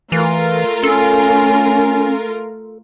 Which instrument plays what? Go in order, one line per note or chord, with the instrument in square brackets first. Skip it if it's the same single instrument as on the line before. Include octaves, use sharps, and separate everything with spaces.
[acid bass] E3 [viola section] A3 F4 A#4
[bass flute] C#4 [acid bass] A4